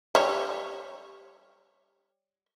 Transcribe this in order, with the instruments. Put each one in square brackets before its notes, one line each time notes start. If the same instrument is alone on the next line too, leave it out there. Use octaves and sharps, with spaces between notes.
[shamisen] G3 C#5